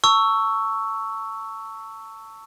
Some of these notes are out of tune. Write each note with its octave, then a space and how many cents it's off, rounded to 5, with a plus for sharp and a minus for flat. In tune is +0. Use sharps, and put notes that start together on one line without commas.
A5 +30 C#6 +10 E6 +0